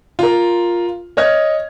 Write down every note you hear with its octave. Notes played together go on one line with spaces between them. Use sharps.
F4 A#4
C#5 D#5 F6 G#6